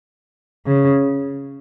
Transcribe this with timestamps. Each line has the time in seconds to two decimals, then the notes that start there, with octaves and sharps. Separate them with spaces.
0.66 C#3